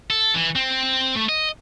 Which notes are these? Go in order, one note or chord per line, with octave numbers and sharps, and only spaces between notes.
A4
E3
C4
A3
D#5